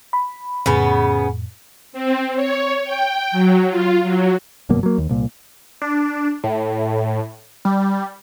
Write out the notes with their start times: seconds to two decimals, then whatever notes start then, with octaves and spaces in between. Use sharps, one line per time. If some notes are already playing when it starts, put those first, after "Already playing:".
0.13 B5
0.66 F2 A2 C#3 B3
1.93 C4
2.36 C#5
2.84 G5
3.31 F#3
3.70 F4
4.03 F#3
4.69 G1 F#2 B2 A#3
4.83 F#3 A#3
4.98 D#2
5.09 C2 A#2
5.82 D4
6.44 A2
7.65 G3